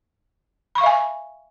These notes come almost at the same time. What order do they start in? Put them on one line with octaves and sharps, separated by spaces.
B5 C#6 F5 E5 G#5